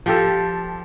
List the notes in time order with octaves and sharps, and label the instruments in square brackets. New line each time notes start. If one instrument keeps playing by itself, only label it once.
[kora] F3 G4 A4